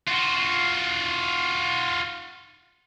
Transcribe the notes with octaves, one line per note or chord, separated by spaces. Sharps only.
F4 F#4